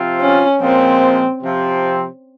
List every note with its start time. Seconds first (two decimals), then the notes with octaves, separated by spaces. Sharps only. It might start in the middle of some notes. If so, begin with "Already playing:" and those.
Already playing: C3 F3 C4 F4
0.21 C#4
0.61 A#2 F3 G#3 C4
1.42 C3 F3 C4